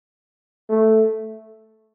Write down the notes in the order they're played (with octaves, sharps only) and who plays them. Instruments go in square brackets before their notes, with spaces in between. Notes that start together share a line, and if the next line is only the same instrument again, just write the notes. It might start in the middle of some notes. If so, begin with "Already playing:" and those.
[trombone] A3